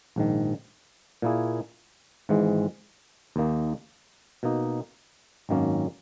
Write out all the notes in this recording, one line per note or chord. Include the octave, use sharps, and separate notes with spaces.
A#1 G#2 D#3
A#2 A#3 E4 G#4
G#1 G#2 E3 G#3
D#2 D#3 A#3 D#4
B2 A#3 D#4
G#1 F#2 D#3 A#3 C#4